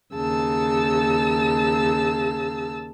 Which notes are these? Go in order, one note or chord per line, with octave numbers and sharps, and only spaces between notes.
D#2 C#3 A5 E6